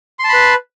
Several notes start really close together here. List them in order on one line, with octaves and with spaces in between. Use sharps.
C6 A5 B5 B4